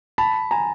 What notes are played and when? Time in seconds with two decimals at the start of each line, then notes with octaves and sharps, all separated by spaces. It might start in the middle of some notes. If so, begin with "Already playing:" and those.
0.18 A5 B5
0.51 G#5 A#5